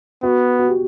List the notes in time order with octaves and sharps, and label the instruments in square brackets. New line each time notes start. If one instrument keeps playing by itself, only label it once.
[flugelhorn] B3 [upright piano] F#4
[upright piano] F#4
G4